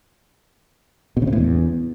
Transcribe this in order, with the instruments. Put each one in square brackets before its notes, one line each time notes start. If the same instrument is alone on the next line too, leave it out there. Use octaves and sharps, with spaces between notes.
[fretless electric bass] B2
C#3
C3
A2
E2